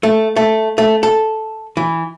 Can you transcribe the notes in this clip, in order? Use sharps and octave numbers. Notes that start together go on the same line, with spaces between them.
A3
A3
A3
A4
E3